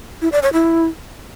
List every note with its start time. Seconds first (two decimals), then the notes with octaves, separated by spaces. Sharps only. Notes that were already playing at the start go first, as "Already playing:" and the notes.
0.22 E4
0.32 D5
0.43 C#5
0.53 E4